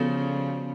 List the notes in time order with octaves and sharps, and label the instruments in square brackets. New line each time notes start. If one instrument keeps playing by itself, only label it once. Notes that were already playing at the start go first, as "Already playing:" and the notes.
Already playing: [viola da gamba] C#3 F3 [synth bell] B3 F#4 A4 D5